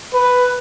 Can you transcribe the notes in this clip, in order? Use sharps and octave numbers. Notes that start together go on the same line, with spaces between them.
B4